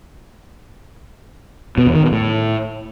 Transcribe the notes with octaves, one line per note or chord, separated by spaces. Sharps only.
B2
E2
D#3
B2
A2